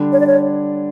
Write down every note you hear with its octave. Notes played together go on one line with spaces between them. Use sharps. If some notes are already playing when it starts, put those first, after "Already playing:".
Already playing: D3 G3 D4
C#5
D5
C#5